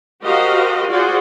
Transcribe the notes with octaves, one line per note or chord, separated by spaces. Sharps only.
F#4 G4 A#4 C5 D#5 F5
F4 F#4 G#4 C5 D5